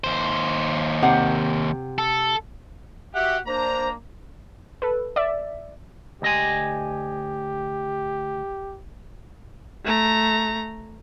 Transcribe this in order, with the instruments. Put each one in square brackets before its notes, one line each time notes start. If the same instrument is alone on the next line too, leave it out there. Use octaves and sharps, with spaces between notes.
[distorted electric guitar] D#2 C5
[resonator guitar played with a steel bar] C3 F#5
[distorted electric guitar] A4
[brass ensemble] F#4 G4 [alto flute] E5 [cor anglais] F#5
[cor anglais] A#3 [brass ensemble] D4 A#5 [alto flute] C5
[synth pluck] A4 B4
D5 E5
[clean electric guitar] D2 D#5 G#5 [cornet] G4
[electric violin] A3 A#5